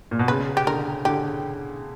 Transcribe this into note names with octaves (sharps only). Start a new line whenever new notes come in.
A#2
B2
C#3 B4
G4
D3 A#4
D3 G4